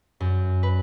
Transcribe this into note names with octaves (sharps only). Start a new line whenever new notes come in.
F#2
B4